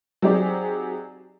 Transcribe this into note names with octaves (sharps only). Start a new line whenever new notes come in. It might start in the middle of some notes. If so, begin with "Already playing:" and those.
F#3 C4 D#4 G4 G#4 D5